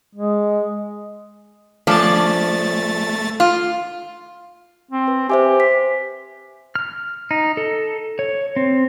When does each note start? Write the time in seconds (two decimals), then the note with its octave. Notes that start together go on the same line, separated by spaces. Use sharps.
0.15 G#3
1.87 F3 A3 C#4 D4 A6
3.40 F4
4.91 C4
5.08 B4
5.30 G4 C5 E5 G#5
5.60 B6
6.76 F6
7.31 D#4
7.57 A4
8.19 C#5
8.56 C4